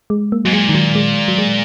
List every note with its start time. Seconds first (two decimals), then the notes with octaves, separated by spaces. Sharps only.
0.10 G#3
0.32 A#3
0.45 G#2 F#3
0.53 A#2 G#3
0.69 D#3
0.75 F#3
0.95 G#3
1.28 F#3
1.38 G#3